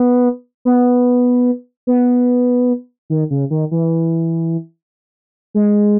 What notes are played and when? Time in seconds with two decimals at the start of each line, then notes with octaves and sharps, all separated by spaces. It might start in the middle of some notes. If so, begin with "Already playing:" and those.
Already playing: B3
0.65 B3
1.87 B3
3.10 D#3
3.31 C#3
3.50 D#3
3.71 E3
5.54 G#3